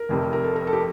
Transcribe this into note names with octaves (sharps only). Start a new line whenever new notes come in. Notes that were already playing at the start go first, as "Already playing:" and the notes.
Already playing: A#4
F1 F2 C3
A#4
A4
A#4
A4
G4